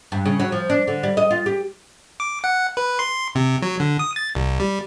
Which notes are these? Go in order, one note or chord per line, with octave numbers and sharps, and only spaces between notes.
G2
C#3
F#3
F3
D4
D3
G3
D#5
F4
G4
D6
F#5
B4
C6
C3
F#3
D3
D#6
A6
C2
G3